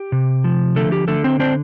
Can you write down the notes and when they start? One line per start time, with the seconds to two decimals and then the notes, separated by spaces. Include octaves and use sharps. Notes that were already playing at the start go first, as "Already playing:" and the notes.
Already playing: G4
0.12 C3
0.44 F3
0.76 D3 A3 A4
0.92 G4
1.08 D3 A3 A4
1.24 C4 C5
1.40 C4 D4 C5